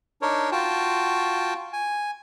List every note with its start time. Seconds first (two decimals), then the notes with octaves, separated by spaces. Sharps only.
0.22 D4 D#4 A#4 C#5
0.52 F4 F#4 G5 A5
1.73 G#5